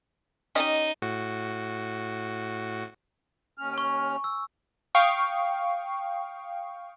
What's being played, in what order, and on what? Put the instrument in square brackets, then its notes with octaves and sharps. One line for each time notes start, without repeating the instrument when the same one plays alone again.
[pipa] C#4 G4 D#5 [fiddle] D#4
[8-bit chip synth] A2 F#4
[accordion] D#2 C#4 F6
[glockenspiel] G#5 C#6
E6
[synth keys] F5 G5 C#6 D#6